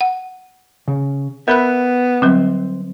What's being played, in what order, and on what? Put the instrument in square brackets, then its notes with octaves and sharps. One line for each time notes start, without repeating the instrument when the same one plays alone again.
[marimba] F#5
[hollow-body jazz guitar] C#3
[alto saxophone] B3 [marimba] A#4 B5 F#6 [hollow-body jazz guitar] E5
[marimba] D3 F#3 G3 [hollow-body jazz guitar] C4